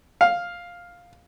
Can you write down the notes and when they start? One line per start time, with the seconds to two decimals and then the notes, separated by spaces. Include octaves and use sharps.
0.21 F5